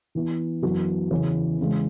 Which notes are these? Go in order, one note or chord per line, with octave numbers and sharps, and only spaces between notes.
E3 B3 E4
F#2 E3 B3 F#4
E2 C#3 E3 C#4
E2 C#3 G#3